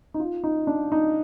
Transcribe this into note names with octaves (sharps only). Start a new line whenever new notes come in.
D#4
F4
D#4
D4
D#4